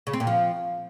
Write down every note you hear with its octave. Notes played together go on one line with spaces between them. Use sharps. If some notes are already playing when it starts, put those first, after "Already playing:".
C#3
C4
A#2
F3